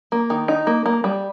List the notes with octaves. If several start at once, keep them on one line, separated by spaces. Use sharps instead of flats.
A#3
D#3
D#4
A#3
A#3
G3